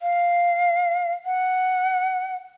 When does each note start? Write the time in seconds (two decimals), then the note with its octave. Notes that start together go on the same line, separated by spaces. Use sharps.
0.02 F5
1.25 F#5